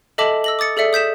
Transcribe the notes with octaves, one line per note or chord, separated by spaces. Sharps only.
A4 D#5 E5 A5 D6 F#7
E6 A#6 F#7
D6 D#6 A6 C#7
G#4 A4 D5 E5 C#7
D#6 G6 B6 E7